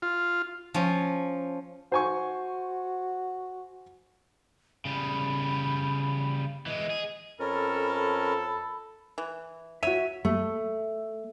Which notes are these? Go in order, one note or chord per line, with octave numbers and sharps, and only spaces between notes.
F4
F3 C#4
F#4 C5 G#5 C#6
C#3 G3 B5
E3 G#3 D#5
G#4
F2 C#4 A4 A#4 B5
E3
F#4 C#5 E5 D#7
A3